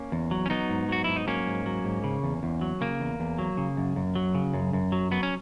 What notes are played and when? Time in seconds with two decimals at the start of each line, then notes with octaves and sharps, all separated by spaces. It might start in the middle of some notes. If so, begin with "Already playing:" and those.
Already playing: A#3 C#4
0.12 E2
0.31 F#3
0.46 C#4
0.50 F#3 B3 D#4
0.70 G#2
0.89 F#3 F#4
1.04 G#2 E4
1.16 D#4
1.27 F#3 A#3 C#4
1.46 G#2
1.66 F#3
1.85 G#2
2.04 C#3
2.23 E2
2.43 E2
2.61 F#3
2.81 C#3 A#3
3.00 E2
3.20 E2
3.38 F#3
3.57 C#3
3.77 F#2
3.96 F#2
4.15 F#3
4.35 C#3
4.54 F#2
4.73 F#2
4.92 F#3
5.11 F#3 B3
5.23 C#4